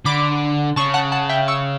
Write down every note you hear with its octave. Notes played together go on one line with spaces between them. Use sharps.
D3 B5 D6
C#3 A5 C#6
F#5 A5
F#5 A5
E5 G5
C#6 E6